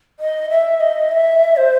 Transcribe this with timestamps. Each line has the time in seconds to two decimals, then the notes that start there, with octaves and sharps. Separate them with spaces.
0.20 D#5
0.50 E5
0.80 D#5
1.11 E5
1.57 C5